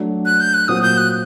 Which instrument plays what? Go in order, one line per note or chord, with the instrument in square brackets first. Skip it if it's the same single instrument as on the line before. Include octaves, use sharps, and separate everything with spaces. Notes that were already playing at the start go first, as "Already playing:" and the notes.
Already playing: [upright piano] F#3 A3 D4
[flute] F#6
G6
F#6
[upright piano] A#2 F#3 C4 F#4 [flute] D#6
[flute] G6
F#6